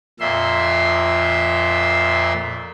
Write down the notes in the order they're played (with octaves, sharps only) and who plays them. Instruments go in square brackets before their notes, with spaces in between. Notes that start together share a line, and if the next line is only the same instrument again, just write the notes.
[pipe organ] F2 A#2 E5 C6